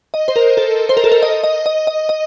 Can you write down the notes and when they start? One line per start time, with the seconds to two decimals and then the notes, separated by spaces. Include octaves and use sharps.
0.14 D#5
0.28 C5
0.36 A#4
0.57 A4
0.89 C5
0.97 A#4
1.04 A4
1.12 A#4
1.23 D#5
1.44 D#5
1.66 D#5
1.87 D#5
2.09 D#5